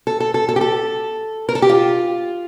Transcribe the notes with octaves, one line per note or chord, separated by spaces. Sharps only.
A4
A4
A4
A4
G4
A4
A#4
A4
G4
F4